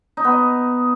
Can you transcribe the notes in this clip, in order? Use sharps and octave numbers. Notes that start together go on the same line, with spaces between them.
D#4
B3
D#5